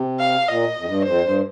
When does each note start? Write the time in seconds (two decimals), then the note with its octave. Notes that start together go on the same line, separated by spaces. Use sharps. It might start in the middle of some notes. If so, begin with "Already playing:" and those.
Already playing: C3
0.20 F5
0.47 A#2 D#5
0.78 F2
0.86 G2
1.05 F2 C5
1.24 G2